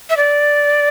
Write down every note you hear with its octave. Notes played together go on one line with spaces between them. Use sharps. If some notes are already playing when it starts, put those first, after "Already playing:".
E5
D5